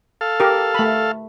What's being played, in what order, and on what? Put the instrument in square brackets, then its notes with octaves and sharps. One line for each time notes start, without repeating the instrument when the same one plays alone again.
[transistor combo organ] A4 F5
[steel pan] G4 A#4
A3 B5